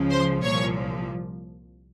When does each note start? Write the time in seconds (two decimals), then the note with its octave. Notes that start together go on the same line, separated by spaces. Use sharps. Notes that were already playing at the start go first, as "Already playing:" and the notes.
Already playing: C#2 C#3 F3
0.11 C5 C6
0.43 C2 A#2 F3 C#5 C#6